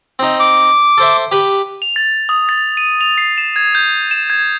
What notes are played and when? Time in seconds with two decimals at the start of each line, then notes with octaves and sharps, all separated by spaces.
0.19 C4 D#4
0.40 D6
0.98 A4 C5 E5
1.32 G4 B4
1.82 F7
1.96 A6
2.29 D#6
2.49 A6
2.77 D#7
3.01 F7
3.18 C7
3.38 E7
3.56 G#6
3.75 G6
4.11 E7
4.30 G#6